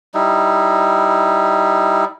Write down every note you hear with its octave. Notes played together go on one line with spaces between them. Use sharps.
G3 D#4 E4